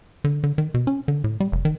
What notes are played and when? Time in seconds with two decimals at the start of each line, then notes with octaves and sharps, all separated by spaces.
0.24 D3
0.44 D3
0.58 D#3
0.74 B2
0.87 C#4
1.08 D3
1.24 A2
1.40 G3
1.52 F1
1.65 D#3